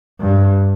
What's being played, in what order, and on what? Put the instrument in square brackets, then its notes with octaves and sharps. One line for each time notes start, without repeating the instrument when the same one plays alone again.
[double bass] G2